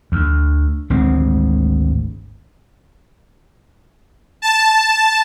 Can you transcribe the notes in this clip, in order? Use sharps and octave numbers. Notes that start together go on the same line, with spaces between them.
D2
G#1 D2 G#3 C4
A5